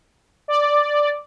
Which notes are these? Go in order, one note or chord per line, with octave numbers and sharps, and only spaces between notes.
D5